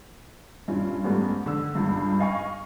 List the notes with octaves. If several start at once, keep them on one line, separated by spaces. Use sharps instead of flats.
G2 A#2 C#4
G#2 G3 A3 B3 C#4
D3 E6
G1 C#2 G2
D#5 F5 G#5 C#6